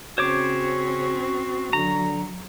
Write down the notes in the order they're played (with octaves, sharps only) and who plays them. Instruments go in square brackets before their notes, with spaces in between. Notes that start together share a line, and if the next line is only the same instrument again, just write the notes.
[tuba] C#3 [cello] C4 C#4 [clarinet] F#4 [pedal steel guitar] C5 C#5 D6
[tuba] D3 [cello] F#3 [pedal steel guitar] A#5